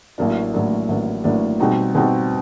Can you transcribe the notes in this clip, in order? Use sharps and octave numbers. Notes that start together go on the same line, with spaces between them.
A1 A2 F#3 A#3 D4
A1 A2 F#3 A#3 D4
A1 A2 F#3 A#3 D4
A1 A2 F#3 A#3 D4
B2 G3 C4 D#4 F#4
B2 G3 C4 D#4 F#4